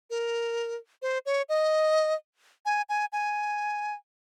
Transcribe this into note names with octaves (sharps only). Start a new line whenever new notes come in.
A#4
C5
C#5
D#5
G#5
G#5
G#5